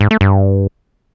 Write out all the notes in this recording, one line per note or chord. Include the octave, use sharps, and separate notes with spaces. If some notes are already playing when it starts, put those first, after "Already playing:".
G#2
A3
G2